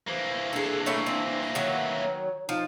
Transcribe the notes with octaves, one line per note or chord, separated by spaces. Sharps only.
E3 A#3 C5
D4 G#4 A4
A3 E4 C#5
C4
D#3 F#3 C#5
F3 D#4